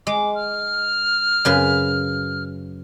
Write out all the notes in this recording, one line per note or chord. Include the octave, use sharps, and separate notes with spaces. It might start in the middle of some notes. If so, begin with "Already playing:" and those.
G#3 D6
F6
F#2 C#3 B4